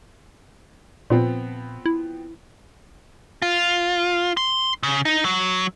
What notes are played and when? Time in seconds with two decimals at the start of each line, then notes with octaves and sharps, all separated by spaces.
1.10 A#2 F3 B3 C4
1.86 E4
3.42 F4
4.37 C6
4.83 C#3
5.05 D#4
5.25 F#3